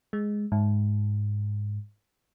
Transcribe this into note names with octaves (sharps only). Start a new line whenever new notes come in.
G#3
G#2